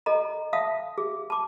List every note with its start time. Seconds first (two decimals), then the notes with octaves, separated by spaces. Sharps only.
0.06 A4 D#5 A#5
0.53 E5 F5 A5 D#6
0.98 G#4
1.30 A5 D6